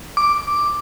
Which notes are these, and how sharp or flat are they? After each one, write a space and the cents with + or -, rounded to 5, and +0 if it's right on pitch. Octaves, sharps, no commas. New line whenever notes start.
D6 +0